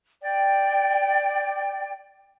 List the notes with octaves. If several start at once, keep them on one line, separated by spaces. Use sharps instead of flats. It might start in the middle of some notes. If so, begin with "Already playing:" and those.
D5 G5